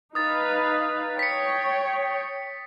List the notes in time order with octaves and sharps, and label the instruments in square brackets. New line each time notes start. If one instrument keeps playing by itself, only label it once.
[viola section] D#4 B4 F5 [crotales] D#6 A6
[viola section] C#5 G5 [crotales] B6 C#7